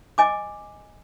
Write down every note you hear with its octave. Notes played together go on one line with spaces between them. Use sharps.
D#5 G#5 D6